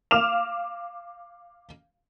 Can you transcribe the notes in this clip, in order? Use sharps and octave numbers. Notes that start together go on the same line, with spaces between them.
F5 D6 F6 E7 F7